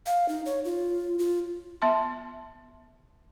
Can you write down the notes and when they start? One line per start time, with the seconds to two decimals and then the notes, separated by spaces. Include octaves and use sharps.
0.06 F5
0.29 D#4
0.46 C#5
0.65 F4
1.19 F4
1.82 B3 E5 A5 C6